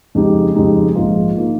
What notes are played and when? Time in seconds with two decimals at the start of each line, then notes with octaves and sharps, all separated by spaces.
0.15 F2 C#3 G#3 D#4 G4
0.55 F2 C#3 G#3 D#4 G4
0.95 A#1 G#2 D#3 A#3 F4
1.37 D#3 A#3 F4